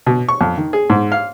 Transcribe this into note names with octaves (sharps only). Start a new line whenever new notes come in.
B2
C#6
F2
D#3
G#4
G#2
F5